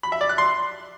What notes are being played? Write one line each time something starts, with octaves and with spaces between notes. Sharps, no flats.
B5
E5
D5
F#6
C6